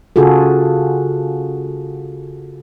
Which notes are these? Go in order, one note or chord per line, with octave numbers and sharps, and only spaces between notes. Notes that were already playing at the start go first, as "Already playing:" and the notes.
C#3 F4 F#4 G#4 A4